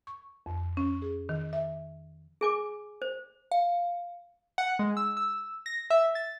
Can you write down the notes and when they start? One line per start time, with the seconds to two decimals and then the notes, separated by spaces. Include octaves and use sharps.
0.07 C#6
0.46 F2
0.77 C#4
1.02 G#4
1.29 D#3
1.53 E5
2.41 G#4 G#5 D6
3.02 C5
3.52 F5
4.58 F#5
4.79 G#3
4.97 E6
5.17 E6
5.66 A#6
5.90 E5
6.15 A6